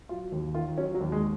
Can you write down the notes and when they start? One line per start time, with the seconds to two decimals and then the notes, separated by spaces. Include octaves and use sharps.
0.09 F#3 F4
0.32 D#2
0.55 D#3 F4
0.78 F#3 C#4
0.95 F#3
1.01 D#2
1.12 G#3